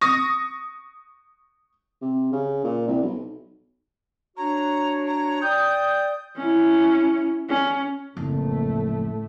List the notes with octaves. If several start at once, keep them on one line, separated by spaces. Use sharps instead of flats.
C#6 D#6 A#6
C3
C#3
A#2
C2
B1
D4 F#4 C#5 A#5
A#5
D5 G5 D#6 G6
C#4 E4
C#4
F#1 F2 A2 A3